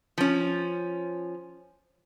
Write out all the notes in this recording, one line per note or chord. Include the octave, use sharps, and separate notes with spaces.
F3 C#4